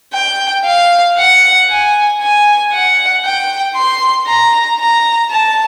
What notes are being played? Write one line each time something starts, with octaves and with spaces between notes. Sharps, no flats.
G5
F5
F#5
G#5
G#5
F#5
G5
C6
A#5
A#5
A5